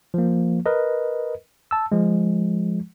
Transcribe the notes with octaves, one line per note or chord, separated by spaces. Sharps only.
F3 A#3
A#4 B4 D#5
A5 E6
F3 G#3